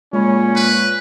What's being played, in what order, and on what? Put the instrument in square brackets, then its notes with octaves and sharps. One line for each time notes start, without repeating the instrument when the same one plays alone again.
[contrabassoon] A#2 [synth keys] G#3 B5 [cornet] C#4
[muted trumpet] B4